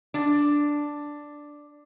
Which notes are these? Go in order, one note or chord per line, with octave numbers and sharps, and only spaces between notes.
D4 D5